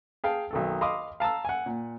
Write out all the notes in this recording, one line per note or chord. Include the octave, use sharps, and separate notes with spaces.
G#4 F5 G5 A5
B1 D#3 A4
D#5 F5 B5 C6 D6 D#6
F5 A5 A#5 E6
F#5 G#5
A#2